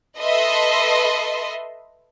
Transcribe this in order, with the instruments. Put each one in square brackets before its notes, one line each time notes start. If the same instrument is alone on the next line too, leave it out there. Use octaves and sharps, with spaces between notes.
[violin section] A4 B4 D#5 E5 C6